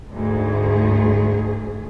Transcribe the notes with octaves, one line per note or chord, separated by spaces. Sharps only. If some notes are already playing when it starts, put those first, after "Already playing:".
D2 G#2 G#4